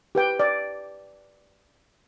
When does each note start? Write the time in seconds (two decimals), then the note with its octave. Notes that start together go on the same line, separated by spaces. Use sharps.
0.15 G4 B4 G5
0.40 D5